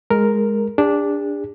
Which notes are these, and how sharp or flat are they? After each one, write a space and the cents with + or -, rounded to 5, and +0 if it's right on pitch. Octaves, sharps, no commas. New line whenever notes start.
G#3 +0 A#4 +0
D4 -5 G#4 -45